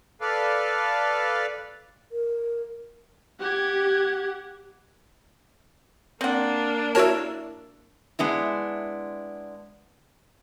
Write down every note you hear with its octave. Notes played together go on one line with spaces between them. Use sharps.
A4 B4 D5 F5
A#4
G4 F#5 G#6
A#3 C4 D4 F#5
E4 F#4 A#4 C#5 A5
G#3 B3 D4 E4